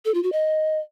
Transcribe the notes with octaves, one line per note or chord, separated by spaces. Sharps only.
A4
F4
F#4
D#5